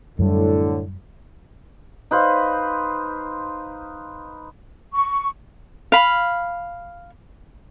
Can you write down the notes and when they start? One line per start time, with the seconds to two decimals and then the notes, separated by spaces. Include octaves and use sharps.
0.19 F#2 A2 D3 G3
2.11 D#4 B4 C5 F5
4.93 C#6
5.92 F5 B5